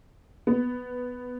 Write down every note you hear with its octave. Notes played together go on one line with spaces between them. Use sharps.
B3